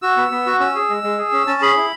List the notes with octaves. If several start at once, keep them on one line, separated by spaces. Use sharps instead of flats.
F#4 E6
B3
B3
F#4
C#4 E6
G#4
G#3
G#3
G#4
C#4
C#4 A5
G#4 B5
E4